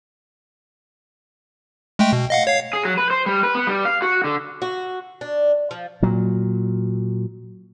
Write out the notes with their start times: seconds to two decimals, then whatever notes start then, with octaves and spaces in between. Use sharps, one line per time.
1.99 G#3 A3 G5
2.13 B2
2.30 D#5 F5 F#5
2.47 C#5 F5 C7
2.73 G#4
2.85 F#3
2.97 B4
3.11 C5
3.26 G3
3.43 B4
3.55 B3
3.67 G3
3.85 F5
4.02 F#4
4.24 D3
4.62 F#4
5.21 D4
5.71 F3
6.02 A#2 F#3